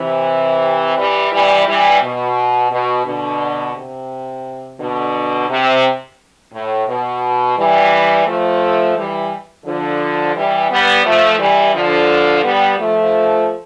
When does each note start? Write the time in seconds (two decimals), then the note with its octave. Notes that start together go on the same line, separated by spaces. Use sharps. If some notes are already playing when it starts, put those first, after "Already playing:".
Already playing: C3 E3
0.97 E3 G3
1.32 E3 G3
1.67 E3 G3
2.02 B2
2.71 B2
3.06 B2 D3
3.75 C3
4.79 B2 D3
5.49 C3
6.53 A2
6.88 B2
7.58 E3 G3
8.26 F3 A3
8.97 E3 G3
9.66 D3 F3
10.35 E3 G3
10.70 G3 B3
11.05 F3 A3
11.39 E3 G3
11.75 D3 F3
12.44 G3 B3
12.78 F3 A3